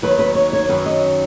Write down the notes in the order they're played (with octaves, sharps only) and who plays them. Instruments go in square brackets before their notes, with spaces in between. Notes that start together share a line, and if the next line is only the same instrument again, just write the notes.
[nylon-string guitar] D#2 D#3 F#3 B4
B4
C#5
C#5
F#2 D#3 F#3 B4
D#5